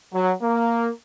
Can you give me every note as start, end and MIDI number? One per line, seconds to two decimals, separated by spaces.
0.14 0.32 54
0.42 0.89 58